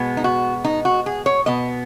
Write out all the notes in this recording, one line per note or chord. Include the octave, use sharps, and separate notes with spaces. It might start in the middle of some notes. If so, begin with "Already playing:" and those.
Already playing: B2 G#3 B3
D#4
F#4
D#4
F#4
G#4
C#5
B2 B3 D#5